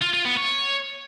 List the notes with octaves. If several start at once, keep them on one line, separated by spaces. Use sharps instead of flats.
F4
F4
B3
C#5